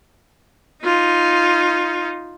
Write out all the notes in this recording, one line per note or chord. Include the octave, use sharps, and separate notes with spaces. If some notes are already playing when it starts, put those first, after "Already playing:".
D#4 F4